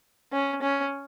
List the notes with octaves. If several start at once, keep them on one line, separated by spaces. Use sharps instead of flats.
C#4
C#4